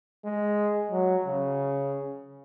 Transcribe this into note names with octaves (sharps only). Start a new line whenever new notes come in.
G#3
F#3
C#3